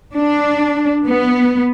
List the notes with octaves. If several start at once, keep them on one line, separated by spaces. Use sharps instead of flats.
D4
B3